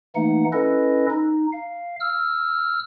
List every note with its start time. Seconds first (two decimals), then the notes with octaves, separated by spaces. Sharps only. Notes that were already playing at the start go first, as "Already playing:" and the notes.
0.15 E3 A3 A#3 D#4 F#5
0.53 C#4 E4 A4 B4 D#5
1.10 D#4
1.52 F5
2.00 E6 F6